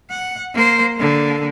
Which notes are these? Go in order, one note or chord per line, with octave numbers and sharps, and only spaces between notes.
F#5
A#3 C5
D3 A#3